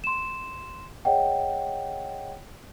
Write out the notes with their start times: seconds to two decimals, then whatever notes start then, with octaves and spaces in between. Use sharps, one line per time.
0.04 C6 E7
1.05 G#4 C#5 D#5 F#5 G5